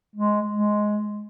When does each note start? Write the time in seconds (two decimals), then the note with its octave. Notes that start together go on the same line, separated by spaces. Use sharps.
0.16 G#3
0.50 G#3